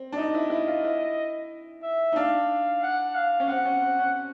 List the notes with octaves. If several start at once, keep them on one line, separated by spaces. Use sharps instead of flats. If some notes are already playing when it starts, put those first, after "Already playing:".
Already playing: C4
D4
D#4 D#5
E4
E4
F4
E4
E5
D#4
D4 F5
F#5
F5
C#4
C4 F#5
C#4
C4
C#4